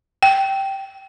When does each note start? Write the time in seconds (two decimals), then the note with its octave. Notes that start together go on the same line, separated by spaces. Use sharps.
0.23 G5